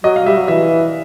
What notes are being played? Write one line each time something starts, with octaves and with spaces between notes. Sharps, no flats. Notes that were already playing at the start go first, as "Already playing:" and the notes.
F#3 D#5
F5
G3 E5
F#3
E3 E5